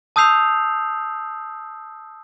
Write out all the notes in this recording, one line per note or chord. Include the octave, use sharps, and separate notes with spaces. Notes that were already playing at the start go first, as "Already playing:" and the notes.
A5 D#6 E6 G6 C7 F7